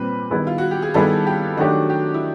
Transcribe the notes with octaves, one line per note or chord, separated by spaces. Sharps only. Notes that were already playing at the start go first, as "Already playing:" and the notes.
Already playing: A#2 G3 C4 B4
D#3 G3 B3 E4 G#4
F4
F#4
G4
G#4
D#3 G3 B3 E4 G#4 A4
G4
D#3 F#3 A3 D4 F#4 G4
G4
E4